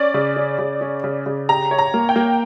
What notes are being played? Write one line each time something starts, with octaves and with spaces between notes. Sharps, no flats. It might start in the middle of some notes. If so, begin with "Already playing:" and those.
Already playing: C#4 D5
C#3
C#4
C#3
C#4
C#3
C#3
G4 A#5
C#5
A#5
A#3
G5
A#3